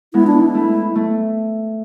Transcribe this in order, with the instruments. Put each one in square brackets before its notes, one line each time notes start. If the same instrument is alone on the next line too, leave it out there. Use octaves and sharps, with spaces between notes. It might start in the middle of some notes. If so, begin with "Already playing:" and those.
[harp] G#3 B3 [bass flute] E4
[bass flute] D4
E4
[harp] A3
A3